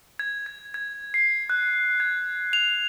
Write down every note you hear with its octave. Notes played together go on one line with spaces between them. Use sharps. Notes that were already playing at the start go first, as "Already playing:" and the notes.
G#6
G#6
G#6
C7
F#6
G#6
F7